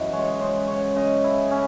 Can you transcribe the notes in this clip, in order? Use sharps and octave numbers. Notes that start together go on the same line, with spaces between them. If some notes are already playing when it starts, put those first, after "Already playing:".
Already playing: F#2 E3 D#5 F#5
G#3 C#5
C#3 C5
C#3 C#5
C#3 D#5
E4
C#4